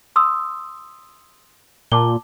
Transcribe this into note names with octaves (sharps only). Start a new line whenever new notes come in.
C6 D#6 E6
A#2 A5 D6 G7